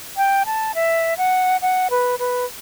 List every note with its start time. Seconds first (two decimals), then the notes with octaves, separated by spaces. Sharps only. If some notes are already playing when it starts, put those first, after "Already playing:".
0.17 G5
0.46 A5
0.75 E5
1.18 F#5
1.62 F#5
1.91 B4
2.19 B4